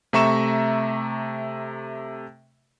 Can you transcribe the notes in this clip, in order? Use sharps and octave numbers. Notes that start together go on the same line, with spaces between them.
C3 A3 E5 A#5 C#6 E7